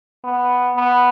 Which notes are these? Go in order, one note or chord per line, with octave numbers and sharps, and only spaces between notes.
B3
B3